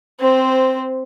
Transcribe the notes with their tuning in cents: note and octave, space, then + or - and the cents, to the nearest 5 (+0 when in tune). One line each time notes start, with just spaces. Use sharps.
C4 +0 C5 -10